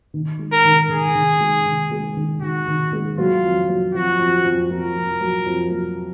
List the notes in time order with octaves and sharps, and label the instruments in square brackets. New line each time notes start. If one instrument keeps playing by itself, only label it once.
[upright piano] D#3
G#3
[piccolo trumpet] A#4
[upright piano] D#3
[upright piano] D#3 [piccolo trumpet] G#4
[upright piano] D#3
G#3
D#3
G#3
D#3
[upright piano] D#3 [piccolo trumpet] F#4
[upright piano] D#3
G#3
[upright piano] F#3 [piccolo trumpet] F4
[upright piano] F2
F#3
[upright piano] F2 [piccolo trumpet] F#4
[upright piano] F2
F2
[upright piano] F2 [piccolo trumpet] A#4
[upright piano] F2
F#3
F2
F#3